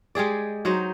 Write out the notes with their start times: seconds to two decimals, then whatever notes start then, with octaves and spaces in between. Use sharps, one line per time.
0.15 G#3 G4 G#4 D5
0.65 F#3 D#4 C5 D#5